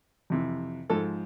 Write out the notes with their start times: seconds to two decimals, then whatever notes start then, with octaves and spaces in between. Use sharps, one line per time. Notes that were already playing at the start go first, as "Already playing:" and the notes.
0.30 F2 C3 E3
0.90 G#2 F3 A4